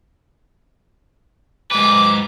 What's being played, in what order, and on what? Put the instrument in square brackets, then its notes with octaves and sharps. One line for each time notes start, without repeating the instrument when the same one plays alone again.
[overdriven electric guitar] G#2 B4 [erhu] D6